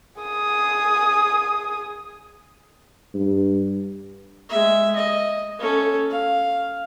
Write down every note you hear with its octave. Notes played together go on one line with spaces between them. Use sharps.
G#4 D#6
G2
G#3 E5
D#5
C#4 A4
F5